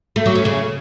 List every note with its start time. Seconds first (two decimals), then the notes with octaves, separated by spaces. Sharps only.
0.16 A3
0.26 F#3
0.35 C#4
0.45 C#3